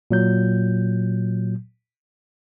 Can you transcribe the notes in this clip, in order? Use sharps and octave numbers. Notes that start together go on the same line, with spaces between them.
A#2 F#3 G6